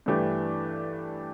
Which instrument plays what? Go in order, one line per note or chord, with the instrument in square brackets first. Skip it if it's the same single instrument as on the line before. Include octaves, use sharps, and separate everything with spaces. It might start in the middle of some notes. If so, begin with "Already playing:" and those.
[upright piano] G2 E3 A3 D4 G4